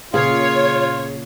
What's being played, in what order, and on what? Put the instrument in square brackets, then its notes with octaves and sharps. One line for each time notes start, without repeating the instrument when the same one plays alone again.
[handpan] A#2 C#3 F5 [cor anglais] F4 [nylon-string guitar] G#4 [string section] C#5